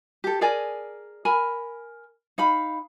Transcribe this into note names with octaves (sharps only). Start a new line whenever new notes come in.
G4 A4
G#4 A#4 D5 G#5
A#4 G#5 B5
D#4 F5 B5